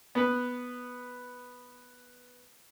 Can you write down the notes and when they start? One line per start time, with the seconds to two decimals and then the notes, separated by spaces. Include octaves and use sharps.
0.15 B3 B4